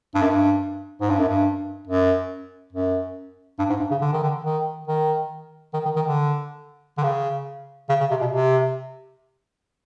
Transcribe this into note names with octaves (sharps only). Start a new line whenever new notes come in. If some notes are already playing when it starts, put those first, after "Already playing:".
G2
F#2
G2
G#2
G2
F#2
G2
F#2
F#2
G2
G#2
G2
C#3
D3
D#3
D3
D#3
D#3
D#3
D#3
D#3
D3
D3
C#3
C#3
C#3
C3
B2
C3